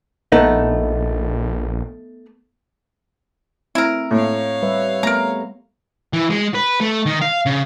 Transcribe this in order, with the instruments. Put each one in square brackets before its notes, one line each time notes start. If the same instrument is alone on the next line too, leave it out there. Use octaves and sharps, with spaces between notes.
[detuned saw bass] A#1 [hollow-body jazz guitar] A3 B3 D#4
[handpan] A3 C4 [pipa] E4 A#4
[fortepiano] A2 [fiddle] C#5 F5
[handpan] G3 B4 E5
[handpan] A3 B3 B4 [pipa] A#4 A#5
[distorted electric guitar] E3
G#3
B4
A3
D#3
F5
C#3